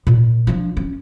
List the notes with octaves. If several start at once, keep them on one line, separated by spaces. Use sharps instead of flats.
A#2
F3 D4
C#4